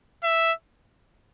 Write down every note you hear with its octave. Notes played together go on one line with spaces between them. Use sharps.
E5